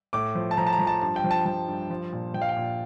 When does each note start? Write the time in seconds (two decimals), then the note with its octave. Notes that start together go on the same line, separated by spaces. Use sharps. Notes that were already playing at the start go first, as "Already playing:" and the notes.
0.13 A2 D6
0.35 F3
0.51 A5
0.57 F3 A#5
0.67 A5
0.72 A#5
0.79 F3
0.87 A5
1.02 G2 A5
1.16 G5
1.24 F3
1.31 A5
1.46 F3 A5
1.68 G2
1.90 F3
2.12 A#2
2.34 F3 G5
2.42 F5
2.49 G5
2.56 A#2